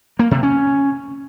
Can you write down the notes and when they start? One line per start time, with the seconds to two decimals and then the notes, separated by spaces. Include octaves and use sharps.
0.19 A#3
0.31 C3
0.43 C#4